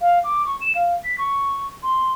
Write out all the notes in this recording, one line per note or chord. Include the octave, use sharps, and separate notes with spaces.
F5
D6
C#6
E7
F5
B6
C#6
C6